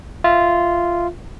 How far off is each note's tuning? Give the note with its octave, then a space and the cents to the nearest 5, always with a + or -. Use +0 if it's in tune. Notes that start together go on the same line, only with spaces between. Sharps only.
F4 -10 E5 +0